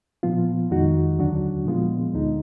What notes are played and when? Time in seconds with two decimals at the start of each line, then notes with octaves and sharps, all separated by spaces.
0.23 A#2 F3 B3 F4
0.70 F2 D#3 G#3 D#4 F#4
1.18 D#2 D3 F#3 D4 F#4
1.66 A#2 F3 G#3 B3 F4
2.14 D2 D3 G#3 D#4